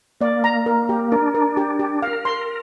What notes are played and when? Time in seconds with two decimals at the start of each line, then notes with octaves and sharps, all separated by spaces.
0.21 A#3 D5
0.44 A#5
0.66 A#4
0.89 G4
1.12 D4 A#4
1.35 A#4
1.57 G4
1.79 G4
2.02 A#4 F5
2.25 C6